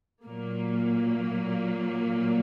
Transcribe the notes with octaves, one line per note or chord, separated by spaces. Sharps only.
A#2 F#3 A#3